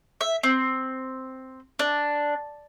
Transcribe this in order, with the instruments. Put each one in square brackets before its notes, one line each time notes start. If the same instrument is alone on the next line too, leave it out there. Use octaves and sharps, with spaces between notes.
[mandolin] E5
C4
D4